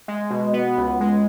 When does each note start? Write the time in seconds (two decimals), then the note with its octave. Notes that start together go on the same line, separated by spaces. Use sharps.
0.08 G#3
0.30 B2
0.53 B3
0.78 C#2
1.00 G#3